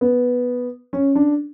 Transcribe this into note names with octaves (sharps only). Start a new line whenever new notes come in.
B3
C#4
D4